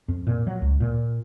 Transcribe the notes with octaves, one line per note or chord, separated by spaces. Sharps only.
F2
A#2
F#3
C#2
A#2